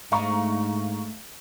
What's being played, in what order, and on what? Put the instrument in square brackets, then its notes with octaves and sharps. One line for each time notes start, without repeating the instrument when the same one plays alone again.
[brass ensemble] G#2 [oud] A3 D4 D#4 [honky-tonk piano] F5 A#5 C#6